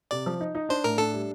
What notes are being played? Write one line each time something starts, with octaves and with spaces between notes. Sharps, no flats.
C3 D5
F3
D#4
D#4
D4 C5
A2 A#4
D4 A4
G3